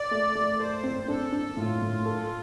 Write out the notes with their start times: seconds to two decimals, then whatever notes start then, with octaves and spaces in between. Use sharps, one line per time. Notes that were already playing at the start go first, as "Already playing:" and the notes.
Already playing: D5
0.11 A3
0.35 A3
0.59 A4 C5
0.83 C4
1.03 C5
1.08 D4 A4
1.32 D4
1.57 A2 F4
1.82 A2
2.06 A4